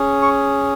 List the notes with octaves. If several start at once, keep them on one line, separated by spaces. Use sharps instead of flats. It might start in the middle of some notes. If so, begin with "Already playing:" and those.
Already playing: C#4 G#4
C#6